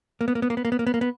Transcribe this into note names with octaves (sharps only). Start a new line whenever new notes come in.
A#3
B3
A#3
B3
A#3
B3
A#3
B3
A#3
B3
A#3
B3